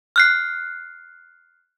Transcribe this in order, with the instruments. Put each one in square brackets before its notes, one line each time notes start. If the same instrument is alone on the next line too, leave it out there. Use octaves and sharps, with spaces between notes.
[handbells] F6 F#6 C7